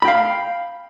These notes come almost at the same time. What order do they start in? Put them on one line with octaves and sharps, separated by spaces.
B5 G5 F5